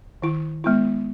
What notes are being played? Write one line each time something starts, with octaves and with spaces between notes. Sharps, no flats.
D#3 E4
G#3 B3 E4